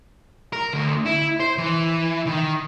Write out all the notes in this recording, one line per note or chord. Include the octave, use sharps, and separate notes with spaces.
A#4
D2
E4
C5
E3
D#3